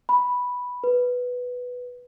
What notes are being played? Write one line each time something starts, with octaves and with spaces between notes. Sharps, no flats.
B5
B4